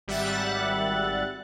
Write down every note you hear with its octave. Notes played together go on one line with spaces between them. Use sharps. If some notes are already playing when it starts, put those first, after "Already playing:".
G#1 G3 E5 F#5 F#6 A6